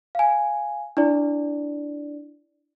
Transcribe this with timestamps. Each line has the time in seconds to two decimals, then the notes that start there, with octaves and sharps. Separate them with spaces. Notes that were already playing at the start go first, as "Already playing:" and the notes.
0.15 F5 G#5
0.97 D4 E4 D5